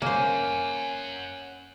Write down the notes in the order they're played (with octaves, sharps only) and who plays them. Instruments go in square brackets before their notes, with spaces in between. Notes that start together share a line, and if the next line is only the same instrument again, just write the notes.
[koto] A#3 C5 [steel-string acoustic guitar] C#4 [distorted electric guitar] F#5 G#5